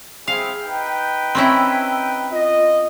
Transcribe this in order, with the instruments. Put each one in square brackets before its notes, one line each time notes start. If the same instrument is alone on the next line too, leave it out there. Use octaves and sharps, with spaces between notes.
[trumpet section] C4 E4 G#4 [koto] F5
[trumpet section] D#4 B4 G5
[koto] C4 C#4 E4
[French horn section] F4 D#5